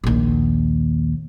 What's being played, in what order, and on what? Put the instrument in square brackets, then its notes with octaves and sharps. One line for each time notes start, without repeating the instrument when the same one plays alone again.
[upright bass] A#1 D#2